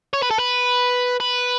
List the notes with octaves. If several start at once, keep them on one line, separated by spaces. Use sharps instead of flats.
C#5
B4
A4
B4
B4